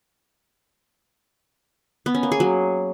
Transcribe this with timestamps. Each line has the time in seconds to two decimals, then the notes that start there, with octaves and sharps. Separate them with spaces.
2.06 B3
2.15 C#4
2.23 A#3
2.32 G#4
2.40 F#3